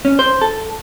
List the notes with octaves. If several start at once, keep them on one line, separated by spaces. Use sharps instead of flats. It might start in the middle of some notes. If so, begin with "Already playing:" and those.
C#4
C5
A4